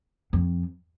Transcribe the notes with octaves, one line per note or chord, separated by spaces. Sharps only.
F2